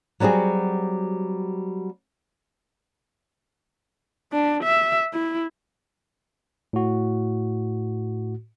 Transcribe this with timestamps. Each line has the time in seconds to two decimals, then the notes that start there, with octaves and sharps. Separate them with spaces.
0.20 F#3 G3 C4 F#4 G#4
4.33 D4
4.63 E5
5.13 E4
6.73 A2 F#4